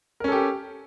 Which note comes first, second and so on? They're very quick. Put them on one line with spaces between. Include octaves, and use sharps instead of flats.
A#4 C#4 A4 G4